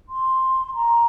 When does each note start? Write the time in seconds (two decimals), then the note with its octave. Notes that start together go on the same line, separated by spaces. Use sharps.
0.09 C6
0.75 A#5